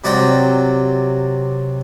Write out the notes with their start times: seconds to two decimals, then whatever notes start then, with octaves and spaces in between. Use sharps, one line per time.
0.04 C3 F#3 D5 F#5 G5